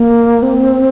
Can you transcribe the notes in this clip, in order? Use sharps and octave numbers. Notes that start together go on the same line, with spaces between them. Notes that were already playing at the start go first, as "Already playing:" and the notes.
Already playing: A#3
C4